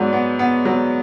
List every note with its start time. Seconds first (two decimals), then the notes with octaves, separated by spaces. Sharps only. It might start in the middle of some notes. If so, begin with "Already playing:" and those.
Already playing: G#2 F#3 B3 D5
0.13 B3
0.39 B3
0.65 F#3